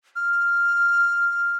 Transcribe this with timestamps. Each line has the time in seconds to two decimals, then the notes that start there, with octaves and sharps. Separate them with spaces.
0.16 F6